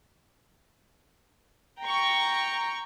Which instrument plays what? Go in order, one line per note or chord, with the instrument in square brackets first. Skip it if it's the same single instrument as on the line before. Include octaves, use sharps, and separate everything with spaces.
[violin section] G5 A#5 C#6